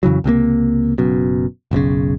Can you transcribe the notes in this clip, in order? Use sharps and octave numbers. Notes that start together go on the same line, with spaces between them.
F2 C#3 E3 F#3
C#2 C3 F3 A#3
F#1 F#2 B2
F#1 B1 A#2 C#3